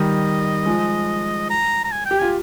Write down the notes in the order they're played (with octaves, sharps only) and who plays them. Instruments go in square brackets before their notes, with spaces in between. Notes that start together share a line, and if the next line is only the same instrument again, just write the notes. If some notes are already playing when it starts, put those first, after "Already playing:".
Already playing: [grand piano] D#3 G3 [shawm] D#5
[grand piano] F3 G#3
[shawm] A#5
A#5
G#5
G5
[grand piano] G4
[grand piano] F4 [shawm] G#5